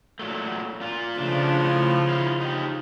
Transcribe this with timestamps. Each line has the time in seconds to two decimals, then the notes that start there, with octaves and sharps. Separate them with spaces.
0.19 A#2 F#3 A3
0.81 A#2 F4
1.18 C#3 F3 A3 D4
1.60 A2
2.09 D#3 E4 F5
2.41 D#4 G4